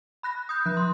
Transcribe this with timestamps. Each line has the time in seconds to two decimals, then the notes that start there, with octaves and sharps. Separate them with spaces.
0.23 B5 F#6 A#6
0.49 D#6 G6
0.66 F3 F#6
0.77 C6